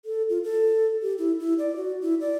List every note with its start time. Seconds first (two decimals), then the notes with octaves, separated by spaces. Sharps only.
0.05 A4
0.29 F4
0.44 A4
1.02 G4
1.19 E4
1.40 E4
1.59 D5
1.76 F#4
2.02 E4
2.21 D5